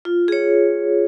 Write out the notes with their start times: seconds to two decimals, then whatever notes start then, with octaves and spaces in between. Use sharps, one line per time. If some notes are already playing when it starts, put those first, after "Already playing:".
0.05 F4
0.28 G#4 C#5